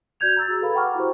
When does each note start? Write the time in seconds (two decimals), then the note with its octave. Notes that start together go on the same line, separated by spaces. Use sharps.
0.20 F#4 D5 G6 G#6 F7
0.37 A#5 E6 A6
0.48 F#4 G#4
0.62 A4 B4 F5 B5
0.75 F#5 G5 A#5 C#6 D6 F6
0.95 E4 F#4 G4 C5